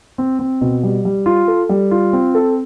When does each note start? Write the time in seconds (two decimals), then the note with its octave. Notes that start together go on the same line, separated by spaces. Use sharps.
0.18 C4
0.39 C4
0.61 B2
0.83 G3
1.05 G3
1.26 F4
1.48 A4
1.69 G3
1.91 F4
2.13 C4
2.35 A4